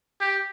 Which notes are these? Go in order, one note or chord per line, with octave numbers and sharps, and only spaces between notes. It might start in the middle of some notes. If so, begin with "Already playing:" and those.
G4